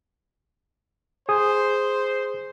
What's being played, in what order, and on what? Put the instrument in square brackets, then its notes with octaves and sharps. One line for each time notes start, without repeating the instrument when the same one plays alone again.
[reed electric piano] G#4 D#6 [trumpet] C5